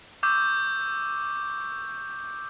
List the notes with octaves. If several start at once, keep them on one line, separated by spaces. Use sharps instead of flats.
C#6 D6 E6 G6